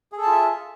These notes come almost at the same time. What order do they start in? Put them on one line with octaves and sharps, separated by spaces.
G#4 A4 A5 F4 E5